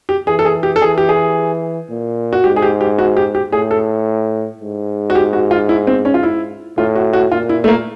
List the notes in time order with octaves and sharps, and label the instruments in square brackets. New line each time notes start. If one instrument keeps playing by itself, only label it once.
[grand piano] G4
[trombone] E3 [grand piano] G#4
[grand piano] A4
G#4
G4
A4
[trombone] E3 [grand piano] G#4
[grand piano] G4
G#4
[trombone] A#2
[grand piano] F#4
[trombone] G#2 [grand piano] G4
[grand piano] G#4
G4
G4
F#4
G4
G4
[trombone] A2 [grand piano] G#4
[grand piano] A4
[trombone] G#2
[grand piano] F#4
G4
F#4
F4
E4
C4
C#4
F4
E4
[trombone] A2 [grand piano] F4
[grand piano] F#4
F#4
[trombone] A#2 [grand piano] F4
[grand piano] E4
A3
A#3